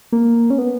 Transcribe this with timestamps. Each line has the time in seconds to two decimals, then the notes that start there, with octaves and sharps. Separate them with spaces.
0.12 A#3
0.50 C#4
0.58 B3